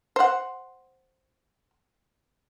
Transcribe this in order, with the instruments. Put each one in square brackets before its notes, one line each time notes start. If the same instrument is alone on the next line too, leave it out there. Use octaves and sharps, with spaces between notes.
[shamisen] C5 F#5